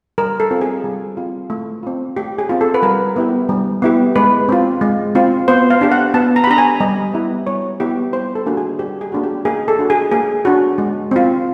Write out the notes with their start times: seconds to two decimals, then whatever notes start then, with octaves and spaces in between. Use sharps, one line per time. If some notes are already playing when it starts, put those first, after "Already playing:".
0.18 G3 A#4
0.40 A4
0.51 C4 F4
0.61 G#4
0.84 G3
1.17 C4 F4
1.50 A3
1.83 C4 F4
2.17 A3 G4
2.38 G#4
2.49 C4 F4
2.61 A4
2.74 B4
2.82 G3 A#4
3.16 B3 E4 G4
3.49 G3
3.82 B3 E4 G4
4.16 G#3 B4
4.49 C4 F4
4.81 G#3
5.15 C4 F4
5.48 B3 C5
5.70 F5
5.81 D4 G4
5.92 F#5
6.14 B3 A5
6.36 A#5
6.44 B5
6.47 D4 G4 A#5
6.58 G#5
6.80 G3 D#5
7.14 B3 E4 G4
7.47 G3 C#5
7.80 B3 E4 G4
8.13 G3 C5
8.35 A4
8.46 A#3 D4 F#4
8.57 G#4
8.79 G3 G4
9.01 G#4
9.12 A#3 D4 F#4
9.23 G4
9.45 A#3 G#4
9.68 A4
9.79 D4 F#4
9.90 G#4
10.11 A#3 G#4
10.45 D4 F#4
10.78 G#3
11.11 C4 F4